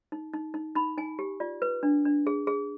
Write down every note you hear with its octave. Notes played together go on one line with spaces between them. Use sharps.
D#4
D#4
D#4
D#4 B5
D#4 G#5
G4
F4 D5
B4
D4
D4
G#4
G#4